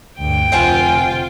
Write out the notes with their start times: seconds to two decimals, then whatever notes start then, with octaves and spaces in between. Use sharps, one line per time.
0.19 D2 G2 G5
0.52 F1 D3 F4 C5 F#5 G#5